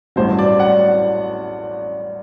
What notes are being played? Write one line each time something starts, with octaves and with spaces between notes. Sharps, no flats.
A1 G2 F#3 C5
D5
F#5